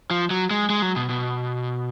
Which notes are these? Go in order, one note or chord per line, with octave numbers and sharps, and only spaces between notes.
F3
F#3
G#3
G#3
F#3
B2
B2